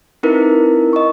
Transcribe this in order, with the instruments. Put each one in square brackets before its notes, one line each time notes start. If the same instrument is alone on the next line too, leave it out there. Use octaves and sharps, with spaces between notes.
[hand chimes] C4 D#4 E4 A#4 B4
D#5 C#6